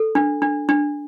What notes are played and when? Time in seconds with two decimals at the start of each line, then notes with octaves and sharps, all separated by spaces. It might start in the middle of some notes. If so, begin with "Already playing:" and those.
Already playing: A4
0.15 D4
0.42 D4
0.69 D4